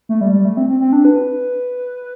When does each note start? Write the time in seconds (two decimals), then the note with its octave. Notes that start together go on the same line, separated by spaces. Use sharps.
0.09 A3
0.21 G3
0.33 G3
0.45 A3
0.57 C4
0.69 C4
0.80 C4
0.93 D4
1.05 B4